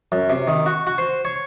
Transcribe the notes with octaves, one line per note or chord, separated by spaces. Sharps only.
F#2
C3
D#3
F#4
F#4
C5
C#5